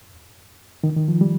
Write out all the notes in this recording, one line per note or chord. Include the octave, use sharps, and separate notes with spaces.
D#3
D#3
F3
G3